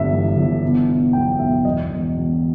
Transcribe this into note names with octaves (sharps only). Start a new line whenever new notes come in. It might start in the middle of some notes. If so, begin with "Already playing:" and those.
Already playing: G1 G2 E5
E3
G1
B2
B2
B1 G5
B1 E5
E2 D#5
E1
B2